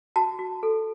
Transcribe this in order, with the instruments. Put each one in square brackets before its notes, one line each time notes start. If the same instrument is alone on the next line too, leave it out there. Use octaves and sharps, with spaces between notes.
[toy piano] F#4 A5
F#4
A4